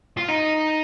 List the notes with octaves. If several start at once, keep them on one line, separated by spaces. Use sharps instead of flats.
F4
D#4